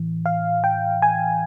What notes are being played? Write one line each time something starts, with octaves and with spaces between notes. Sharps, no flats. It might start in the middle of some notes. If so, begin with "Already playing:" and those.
Already playing: A2 E3
F5
G5
G#5